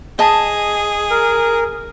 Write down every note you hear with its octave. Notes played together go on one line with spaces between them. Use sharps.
G#4 D#5 A5
A#4